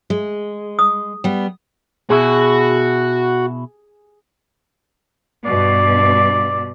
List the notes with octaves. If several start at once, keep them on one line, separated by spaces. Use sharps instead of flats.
G#3
D#6
G3 B3
B2 E4 F#4 G#4
G2 B2 D5